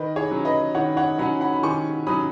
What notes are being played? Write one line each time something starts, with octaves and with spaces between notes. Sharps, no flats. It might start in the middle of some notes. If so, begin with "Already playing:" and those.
Already playing: D#3 B4 D#5
G#4 C#5
F#3 C#4
B4 D#5
D#3 C#5 F#5
C#5 F#5
F#3 C#4 F#5 B5
F#5 B5
B5
D#3 G#5 C#6
F#3 C#4 B5 D#6